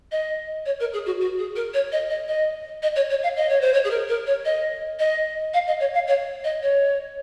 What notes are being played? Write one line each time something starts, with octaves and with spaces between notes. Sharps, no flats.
D#5
C#5
A#4
G#4
F#4
F#4
G#4
A#4
C#5
D#5
D#5
D#5
D#5
C#5
C#5
F5
D#5
C#5
C5
C#5
G#4
A#4
A#4
C#5
D#5
D#5
F5
D#5
C#5
F5
C#5
D#5
C#5